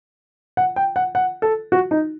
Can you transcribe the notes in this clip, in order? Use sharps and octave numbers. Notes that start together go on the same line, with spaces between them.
F#5
G5
F#5
F#5
A4
F#4
D#4